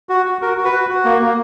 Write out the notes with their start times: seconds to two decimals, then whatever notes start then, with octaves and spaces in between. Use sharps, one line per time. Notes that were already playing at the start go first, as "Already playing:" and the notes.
0.09 F#4
0.26 F#4
0.42 F#4 A#4
0.57 F#4
0.65 B4
0.73 F#4
0.90 F#4
1.05 A#3
1.21 A#3